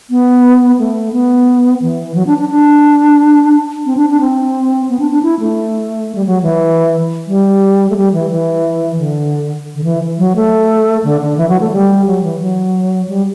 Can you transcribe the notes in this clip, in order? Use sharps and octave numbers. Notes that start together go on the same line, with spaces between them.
B3
A3
B3
E3
F#3
D4
D4
D4
C4
D4
D4
C4
B3
D4
D4
E4
A3
G3
F#3
E3
G3
A3
G3
E3
E3
D3
D3
E3
F#3
A3
D3
D3
E3
F#3
A3
G3
F#3
E3
F#3
G3